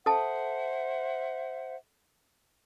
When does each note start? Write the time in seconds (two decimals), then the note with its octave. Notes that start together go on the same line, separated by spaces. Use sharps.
0.06 A4 C5 E5 F#5 A5